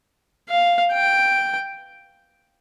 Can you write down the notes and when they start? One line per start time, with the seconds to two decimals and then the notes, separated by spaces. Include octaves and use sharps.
0.49 F5
0.93 G5